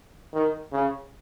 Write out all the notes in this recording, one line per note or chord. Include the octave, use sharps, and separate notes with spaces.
D#3
C#3